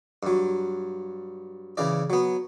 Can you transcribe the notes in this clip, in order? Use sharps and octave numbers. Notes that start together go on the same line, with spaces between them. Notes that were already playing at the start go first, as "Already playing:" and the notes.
G2 F#3
C#3 E3 D5
F#3 B3